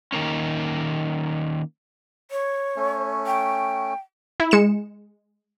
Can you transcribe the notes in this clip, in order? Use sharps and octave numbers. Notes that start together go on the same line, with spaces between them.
D#3 A#3 C#4
C#5
A3 C#4
G5
E4
G#3 C#7 E7